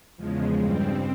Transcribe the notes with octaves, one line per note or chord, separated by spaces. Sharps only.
E2 C#3 F3 G#3
G2 G3 C4